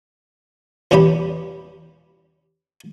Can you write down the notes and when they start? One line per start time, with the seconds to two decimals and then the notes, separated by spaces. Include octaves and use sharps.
0.91 E2 C#3 G3 G4 G5 B5